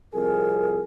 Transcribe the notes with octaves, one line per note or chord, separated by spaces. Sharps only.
C2 F2 G#4 A#4